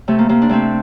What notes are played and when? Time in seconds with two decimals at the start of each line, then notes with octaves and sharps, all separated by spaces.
0.08 C3 A3
0.19 A#3
0.29 C3 A#3
0.42 D4
0.49 C3 A3 C4